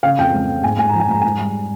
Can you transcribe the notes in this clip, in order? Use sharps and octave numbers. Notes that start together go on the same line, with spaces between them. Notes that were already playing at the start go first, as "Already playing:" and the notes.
C#3 F5
F2 G5
G#3
G#3
G#2 G#5
G#2 G#5
F3 A#5
G#5
G#2 A#5
G#2 G#5
G3